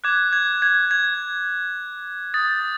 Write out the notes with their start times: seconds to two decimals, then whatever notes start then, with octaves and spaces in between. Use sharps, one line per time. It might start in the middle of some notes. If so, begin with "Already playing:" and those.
0.04 D6 F#6 G#6
0.33 G#6
0.62 G#6
0.91 G#6
2.34 D#6 G6 A6